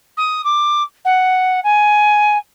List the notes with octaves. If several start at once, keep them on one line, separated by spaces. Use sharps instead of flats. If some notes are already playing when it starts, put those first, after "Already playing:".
D#6
D6
F#5
G#5